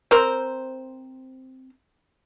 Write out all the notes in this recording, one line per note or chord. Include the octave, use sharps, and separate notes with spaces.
C4 A#4 C5